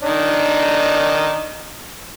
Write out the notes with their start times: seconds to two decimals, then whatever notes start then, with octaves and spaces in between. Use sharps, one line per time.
0.03 D#3 D4 D#4